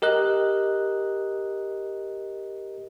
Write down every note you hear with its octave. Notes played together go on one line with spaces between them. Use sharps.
G4 A#4 D#5 F#6